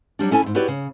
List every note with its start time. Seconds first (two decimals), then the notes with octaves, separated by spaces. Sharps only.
0.19 F#3 G3 D4
0.31 C#4 E4 A4 G#5
0.42 F2 G#2
0.54 E4 F#4 G4 B4 C#5 D5
0.68 C#3